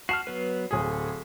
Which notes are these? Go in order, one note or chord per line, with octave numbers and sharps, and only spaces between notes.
F#4 A5 F6 C7
F#3 B3 B4
D1 G#4 A4